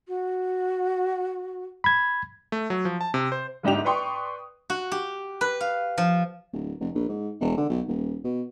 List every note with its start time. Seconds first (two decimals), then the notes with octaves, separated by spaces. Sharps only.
0.08 F#4
1.84 B5 G#6
2.52 A3
2.70 F#3
2.85 F3
3.01 A5
3.14 C3
3.32 C5
3.63 G1 G#2 D4 G4 F7
3.85 B4 D5 G5 C6 C#6 D#6
4.70 F#4
4.92 G4
5.41 B4
5.61 F5
5.98 F3
6.53 D1
6.80 F1
6.95 A#1
7.09 G#2
7.41 E1
7.57 D3
7.69 B1
7.88 D#1
8.24 B2